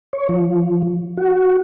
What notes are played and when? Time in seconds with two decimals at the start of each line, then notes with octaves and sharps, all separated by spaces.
0.13 C#5
0.29 F3
1.17 F#4